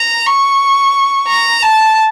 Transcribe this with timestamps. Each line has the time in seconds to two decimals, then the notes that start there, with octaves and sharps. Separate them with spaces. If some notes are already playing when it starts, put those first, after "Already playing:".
Already playing: A#5
0.27 C#6
1.28 A#5
1.62 A5